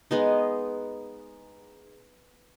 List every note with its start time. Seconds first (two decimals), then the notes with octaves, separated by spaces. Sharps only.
0.11 G#3 B3 D#4